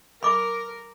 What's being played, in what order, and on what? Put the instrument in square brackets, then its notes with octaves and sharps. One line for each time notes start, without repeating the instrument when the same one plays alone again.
[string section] A#4 [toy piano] B5 D6